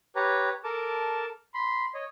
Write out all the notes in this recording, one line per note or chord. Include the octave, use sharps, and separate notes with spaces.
G4 B4 C#5 A#5
A4 A#4 A5 D6
B5 C6
C#5 D#5